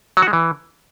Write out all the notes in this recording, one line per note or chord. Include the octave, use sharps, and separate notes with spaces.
F#3
F#4
G#3
E3